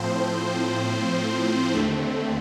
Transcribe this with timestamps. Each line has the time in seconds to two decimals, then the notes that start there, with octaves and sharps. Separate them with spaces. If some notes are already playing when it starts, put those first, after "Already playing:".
Already playing: A2 F3 C4 C5
1.74 D#2 D3 A3 C4